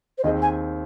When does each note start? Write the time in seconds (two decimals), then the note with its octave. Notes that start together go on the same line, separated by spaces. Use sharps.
0.18 C5
0.24 D#2 D#3 C4 G#4 D#5
0.42 G#5